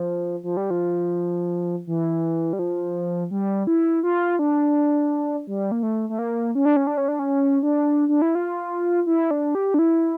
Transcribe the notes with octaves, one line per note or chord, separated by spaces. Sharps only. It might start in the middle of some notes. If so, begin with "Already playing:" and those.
Already playing: F3
F3
G3
F3
E3
G3
F3
G3
E4
F4
D4
G3
A#3
A3
A3
A#3
C#4
D4
C#4
D4
C#4
D4
C#4
D4
D4
E4
F4
E4
D4
G4
D4
E4